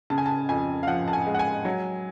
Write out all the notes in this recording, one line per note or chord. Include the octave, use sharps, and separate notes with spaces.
C#3 A5
G#5
A5
F2 G#5
F5
F3 F#5
A5
G#5
G#3
F#5
G#5
F#3